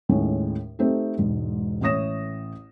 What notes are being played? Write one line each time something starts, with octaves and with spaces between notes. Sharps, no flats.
D#2 A2 G#3 C#4
A3 C4 D#4 G4 A4
E1 G#2
A1 A3 C#5 D#6 A#6 E7